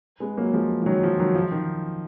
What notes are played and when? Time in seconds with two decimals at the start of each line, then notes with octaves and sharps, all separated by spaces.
0.20 G#3 B3
0.37 F#3 A#3
0.53 F3 G#3
0.82 F3
0.86 D#3 F#3
1.03 F3
1.19 D#3 F#3
1.35 F3
1.52 D#3